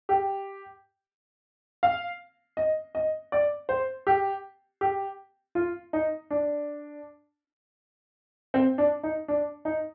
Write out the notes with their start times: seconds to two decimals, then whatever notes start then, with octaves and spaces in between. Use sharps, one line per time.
0.09 G4
1.83 F5
2.57 D#5
2.95 D#5
3.32 D5
3.69 C5
4.07 G4
4.81 G4
5.55 F4
5.93 D#4
6.31 D4
8.54 C4
8.78 D4
9.03 D#4
9.28 D4
9.65 D#4